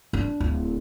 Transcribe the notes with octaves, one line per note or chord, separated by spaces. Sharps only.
D4
D1